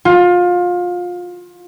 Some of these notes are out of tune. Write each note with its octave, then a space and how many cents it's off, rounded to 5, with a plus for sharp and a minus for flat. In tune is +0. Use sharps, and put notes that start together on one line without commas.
F4 +25